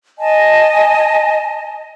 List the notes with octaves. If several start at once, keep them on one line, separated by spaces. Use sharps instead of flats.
D#5 G#5 A5